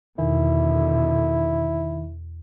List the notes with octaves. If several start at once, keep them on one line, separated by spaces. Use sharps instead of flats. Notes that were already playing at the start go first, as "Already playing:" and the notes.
E2 B2 D3 D#3 E4